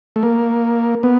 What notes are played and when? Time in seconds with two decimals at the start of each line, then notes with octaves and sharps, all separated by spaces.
0.16 A3
0.23 A#3
1.03 B3